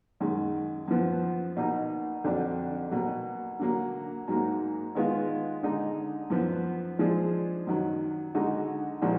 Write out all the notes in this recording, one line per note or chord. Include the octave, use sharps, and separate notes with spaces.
F#2 D#3 G#3
F#2 F3 B3
B2 A#3 D#4
F2 D3 F#3 D4
B2 F#3 A#3
D3 F#3 A#3
G#2 F#3 A#3
D#3 G#3 B3 F4
D3 G#3 D#4
F#2 F3 B3
F3 G#3 D4 G#4
F#2 D#3 F#3
D3 G#3 D#4 F#4
A#2 F3 G#3 D4 F#4